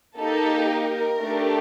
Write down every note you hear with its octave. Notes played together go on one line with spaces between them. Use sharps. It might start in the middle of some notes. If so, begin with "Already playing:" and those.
A#3 D#4 G4 A4
A#4
A3 D4 G4